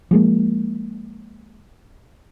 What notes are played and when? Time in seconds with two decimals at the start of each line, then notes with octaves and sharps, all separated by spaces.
0.11 F3 G#3 A#3